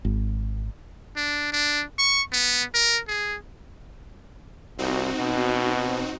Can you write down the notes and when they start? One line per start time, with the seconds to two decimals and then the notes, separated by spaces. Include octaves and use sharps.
0.05 G#1
1.16 D4
1.52 D4
1.99 C#6
2.32 B3
2.74 A#4
3.08 G#4
4.78 C2 C4 D#4 F#4
5.19 B2